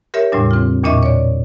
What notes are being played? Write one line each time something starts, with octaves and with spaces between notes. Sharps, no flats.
G4 A#4 C#5 E5
E2 A2 C#3 G3 D4
C4 F4
E2 A#2 D4 D#5 E5 C#6
C#5 D5